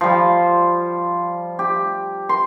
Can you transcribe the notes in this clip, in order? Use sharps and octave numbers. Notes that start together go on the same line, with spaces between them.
F3 G3
G4
C6